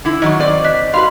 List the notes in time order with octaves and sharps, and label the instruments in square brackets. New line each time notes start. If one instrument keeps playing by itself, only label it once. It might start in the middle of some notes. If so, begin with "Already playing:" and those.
[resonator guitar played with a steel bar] D3 E4
[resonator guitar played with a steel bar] D#3 F#3 [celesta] D#5 C#6
[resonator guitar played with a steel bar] C4 D5
[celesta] D#5 F#6 B6
[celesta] F#4 B5 C6 [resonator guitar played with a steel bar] B4 F5